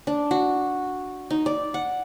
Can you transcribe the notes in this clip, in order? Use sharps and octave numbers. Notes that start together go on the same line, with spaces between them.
D4
F#4
D#4
D5
F#5